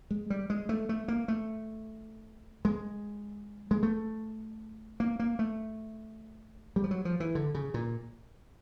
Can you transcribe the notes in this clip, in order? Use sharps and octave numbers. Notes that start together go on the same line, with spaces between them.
G#3
G3
G#3
A3
A3
A#3
A3
G#3
G#3
A3
A#3
A#3
A3
G3
F3
F#3
F3
E3
D3
C#3
A#2